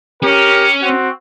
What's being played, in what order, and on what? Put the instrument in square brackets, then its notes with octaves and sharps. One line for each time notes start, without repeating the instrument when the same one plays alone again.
[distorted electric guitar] C#4 [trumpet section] G4 A#4
[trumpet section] C4 F#4